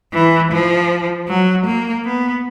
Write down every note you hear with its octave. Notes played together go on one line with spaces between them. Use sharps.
E3
F3
F#3
A#3
B3